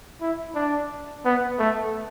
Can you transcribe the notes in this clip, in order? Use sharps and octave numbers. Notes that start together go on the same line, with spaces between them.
E4
D4
B3
A3